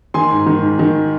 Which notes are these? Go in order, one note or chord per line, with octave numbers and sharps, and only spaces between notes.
D#3 G#5 C6
G#2
D#3
G#2
D#3